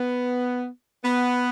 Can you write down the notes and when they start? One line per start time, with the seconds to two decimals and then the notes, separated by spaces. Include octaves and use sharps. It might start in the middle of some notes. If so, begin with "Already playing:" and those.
Already playing: B3
1.04 B3